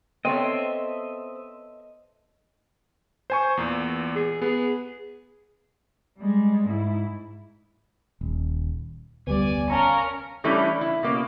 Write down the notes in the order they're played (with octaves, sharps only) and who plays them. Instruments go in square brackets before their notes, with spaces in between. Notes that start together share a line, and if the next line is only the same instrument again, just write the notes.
[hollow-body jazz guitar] B3 A4 C#5 [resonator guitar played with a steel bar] C4 [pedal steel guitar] D#5 E5
[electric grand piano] C5 G#5 C#6
E2 A#2
[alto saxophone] G#4
[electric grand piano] B3 [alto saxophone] G#4
[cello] G3 G#3
G#2 E4
[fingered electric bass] D#1
[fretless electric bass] F1 D2 [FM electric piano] G3 B3 [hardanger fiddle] D5 G#5
[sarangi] C#4 [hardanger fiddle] A#4 C#6 [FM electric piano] F5 A5 A#5
[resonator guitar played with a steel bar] E3 G3 A3 C#4 D4 E4
E4
B2 A#3 C#4